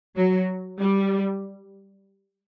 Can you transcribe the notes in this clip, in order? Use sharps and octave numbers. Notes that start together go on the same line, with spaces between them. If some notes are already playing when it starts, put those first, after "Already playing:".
F#3
G3